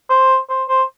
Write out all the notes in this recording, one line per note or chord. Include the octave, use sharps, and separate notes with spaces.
C5
C5
C5